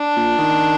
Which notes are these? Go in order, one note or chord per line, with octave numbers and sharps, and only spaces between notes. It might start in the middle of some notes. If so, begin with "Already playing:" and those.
Already playing: D4
A#2
D#3